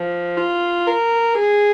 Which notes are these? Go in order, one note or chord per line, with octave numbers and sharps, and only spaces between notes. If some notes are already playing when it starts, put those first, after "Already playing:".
Already playing: F3
F4
A#4
G#4